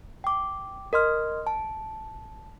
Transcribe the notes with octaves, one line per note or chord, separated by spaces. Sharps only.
G5 D6
A#4 D#5 C6 F6
A5